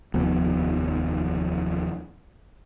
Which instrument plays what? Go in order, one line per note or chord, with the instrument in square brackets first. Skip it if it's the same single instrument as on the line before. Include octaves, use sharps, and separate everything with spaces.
[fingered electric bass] F1 D#2 F3 B3